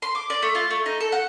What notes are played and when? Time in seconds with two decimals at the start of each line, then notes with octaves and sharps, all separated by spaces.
0.02 C6
0.15 D6
0.30 D5
0.42 A3
0.55 F4
0.71 A3
0.86 D#4
1.00 A4
1.12 F#5